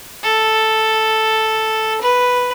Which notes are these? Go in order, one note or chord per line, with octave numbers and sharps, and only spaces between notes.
A4
B4